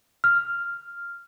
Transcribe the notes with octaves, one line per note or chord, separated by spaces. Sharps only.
F6